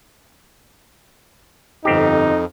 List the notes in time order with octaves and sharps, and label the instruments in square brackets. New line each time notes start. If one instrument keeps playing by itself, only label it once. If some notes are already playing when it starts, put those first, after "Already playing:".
[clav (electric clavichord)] G1 C4 G4 [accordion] F2 [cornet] D#4